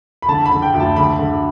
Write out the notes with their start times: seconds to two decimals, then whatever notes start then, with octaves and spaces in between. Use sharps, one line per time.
0.22 B5
0.29 D3 A5
0.46 B5
0.51 D3
0.62 G5
0.74 D2
0.80 A5
0.96 D3 B5
1.19 D3